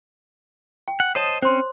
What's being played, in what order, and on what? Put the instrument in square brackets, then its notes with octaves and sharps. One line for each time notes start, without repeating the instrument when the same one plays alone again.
[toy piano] G5
[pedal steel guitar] F#5
[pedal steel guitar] C5 D#5 A5 [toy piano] C#5 D#6
[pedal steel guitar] C4 C#4 [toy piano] C5 C6